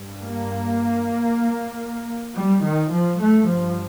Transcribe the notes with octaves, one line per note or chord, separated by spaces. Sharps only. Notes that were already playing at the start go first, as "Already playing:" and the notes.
Already playing: G2
A#3
G3
D#3
F3
G2 A3
F3